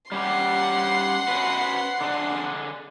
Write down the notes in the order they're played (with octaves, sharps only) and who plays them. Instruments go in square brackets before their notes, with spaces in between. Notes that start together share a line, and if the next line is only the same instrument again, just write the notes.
[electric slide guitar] G3 C#4 G4 [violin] F#5 C6
[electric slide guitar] C#4 F#4 B4
D3 D4 G#4